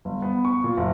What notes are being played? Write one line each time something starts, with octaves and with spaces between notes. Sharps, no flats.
G1
B3
C#6
A#2
F#1